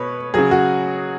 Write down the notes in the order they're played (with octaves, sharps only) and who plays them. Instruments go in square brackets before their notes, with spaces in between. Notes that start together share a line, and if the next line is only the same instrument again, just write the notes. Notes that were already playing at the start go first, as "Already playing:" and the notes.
Already playing: [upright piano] B2 B4 C#5
C#3 F#3 G#4
F#4